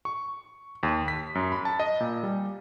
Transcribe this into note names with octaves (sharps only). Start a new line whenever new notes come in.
C#6
D#2
B6
F#2
B5
A5
D#5
A#2
G3